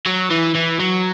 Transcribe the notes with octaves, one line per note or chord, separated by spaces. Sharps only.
F#3
E3
E3
F#3